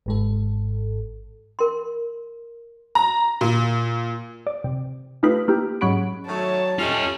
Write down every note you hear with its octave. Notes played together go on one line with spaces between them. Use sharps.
G#1 G#2 A4
A#4 C6
A#5
A#2
D5
C3
A3 D#4 F4 G4 B4
A#3 E4 G4
G#2 F#3 C#4 F#5 B5 D7
D#3 F#3 A3 C#5 A5
A3 C#4 F4 G4 D#5